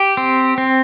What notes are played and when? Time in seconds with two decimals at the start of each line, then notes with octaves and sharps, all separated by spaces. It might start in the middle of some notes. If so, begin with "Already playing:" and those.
Already playing: G4
0.17 C4
0.58 C4